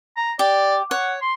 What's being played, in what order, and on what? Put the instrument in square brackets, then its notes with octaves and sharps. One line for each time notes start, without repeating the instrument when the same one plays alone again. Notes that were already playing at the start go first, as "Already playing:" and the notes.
[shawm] A#5
[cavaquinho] G4 [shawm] D5
[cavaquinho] C#5 [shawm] F#5
[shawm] C6